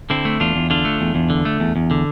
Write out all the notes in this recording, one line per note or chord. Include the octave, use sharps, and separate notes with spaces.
D3 C4 E4
A3
E2 D4 F4
E2
D3 D4 F4
A3
E2
E2
D3
A3
E2
E2
D3